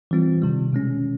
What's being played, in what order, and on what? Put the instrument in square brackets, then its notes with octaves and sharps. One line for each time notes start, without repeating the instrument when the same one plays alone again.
[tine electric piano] E3 G3 C4 F4
C3 D#3 G3
B2 G#3 C#4